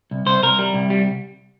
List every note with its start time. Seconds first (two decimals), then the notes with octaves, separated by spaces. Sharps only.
0.11 C2
0.26 C2 C5
0.43 C2 A#4
0.59 G3
0.74 C2
0.90 G3